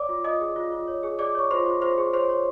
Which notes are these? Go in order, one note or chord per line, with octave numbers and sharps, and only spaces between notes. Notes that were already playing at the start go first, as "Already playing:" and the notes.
Already playing: C#5 D5 D6
F4
F4 D#5 D#6
G#4
F4
F4
C#5
G#4
G#4 D5 D6
C#5 C#6
F4 C5 C6
F4
F4 C5 C6
G#4
C5 C#5 C6
C#5